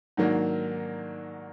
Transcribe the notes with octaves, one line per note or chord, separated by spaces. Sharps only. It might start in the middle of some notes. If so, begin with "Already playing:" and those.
G#2 D#3 F#3 A#3 D4